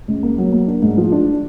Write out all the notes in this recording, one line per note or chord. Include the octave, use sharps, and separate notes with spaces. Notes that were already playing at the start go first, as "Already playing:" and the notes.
C#2
A#3
F#3
A#3
D4
G#2
F3
D4